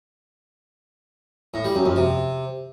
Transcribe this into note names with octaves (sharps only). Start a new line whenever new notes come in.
A2
G3
F#2
F2
C3